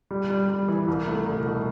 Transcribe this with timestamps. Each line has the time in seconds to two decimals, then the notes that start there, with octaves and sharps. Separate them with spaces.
0.11 G3
0.30 G3
0.49 G3
0.68 E3
0.88 C2
1.07 A3
1.26 C2
1.45 B2